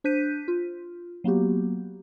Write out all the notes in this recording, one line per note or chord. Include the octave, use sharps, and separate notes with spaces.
D4 C5 F#6 G6 B6 D#7
F4
F#3 A#3 B3 F#4 G4